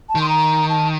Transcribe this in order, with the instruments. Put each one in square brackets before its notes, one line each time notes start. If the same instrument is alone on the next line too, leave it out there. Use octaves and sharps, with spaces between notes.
[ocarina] A5
[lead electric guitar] D#3
[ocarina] C6
A#5
A5